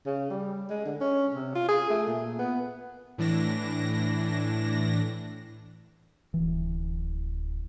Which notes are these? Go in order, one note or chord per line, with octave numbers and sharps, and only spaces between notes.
C#3
G3
G#3
D3
C#4
C3
F4
G#4
A3
A#2
B3
A2 E3 D4 A#6
D1 E3